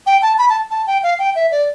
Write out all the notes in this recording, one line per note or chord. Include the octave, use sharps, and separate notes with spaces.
G5
A5
B5
A5
A5
G5
F5
G5
E5
D5